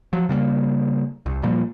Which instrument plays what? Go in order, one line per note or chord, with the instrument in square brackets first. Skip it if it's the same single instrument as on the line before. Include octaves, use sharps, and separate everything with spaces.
[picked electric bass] F3 F#3
C#3 G3 G#3 A#3
C2
A#2 F3 G3 A#3